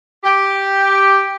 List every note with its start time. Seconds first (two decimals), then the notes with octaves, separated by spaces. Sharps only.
0.24 G4